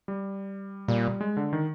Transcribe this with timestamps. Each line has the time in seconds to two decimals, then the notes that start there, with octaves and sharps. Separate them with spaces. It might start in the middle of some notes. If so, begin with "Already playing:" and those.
0.08 G3
0.88 A#2 G3
1.21 G#3
1.37 D3
1.53 D#3